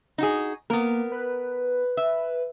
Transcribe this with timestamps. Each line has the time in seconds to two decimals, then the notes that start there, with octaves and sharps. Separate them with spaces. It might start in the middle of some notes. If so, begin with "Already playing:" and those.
0.18 D#4 F#4 G#4
0.70 A#3 B3 A#4
1.12 B4
1.97 E5